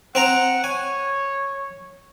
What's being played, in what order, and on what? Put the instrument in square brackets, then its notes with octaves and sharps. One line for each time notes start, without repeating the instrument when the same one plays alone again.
[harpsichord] C4 G5 A#5 [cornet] F#5
[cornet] C#5 [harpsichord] G#5